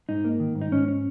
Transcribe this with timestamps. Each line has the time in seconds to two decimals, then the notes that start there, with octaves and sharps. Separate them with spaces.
0.09 G#2 D#4
0.24 A#3
0.40 D#3
0.55 G#2
0.62 D#4
0.72 G#2 C#4
0.88 C#4